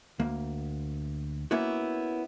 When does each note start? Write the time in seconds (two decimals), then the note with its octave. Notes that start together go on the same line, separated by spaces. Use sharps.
0.19 D2 A#3
1.51 A#3 B3 C#4 E4 F#4